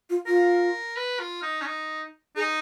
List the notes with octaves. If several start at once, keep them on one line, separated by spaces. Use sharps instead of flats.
F4
F4 A#4
B4
F4
D#4
C#4
D#4
D#4 G#4